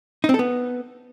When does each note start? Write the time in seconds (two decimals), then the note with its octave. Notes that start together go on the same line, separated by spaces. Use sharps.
0.24 D#4
0.29 C4
0.34 A4
0.39 B3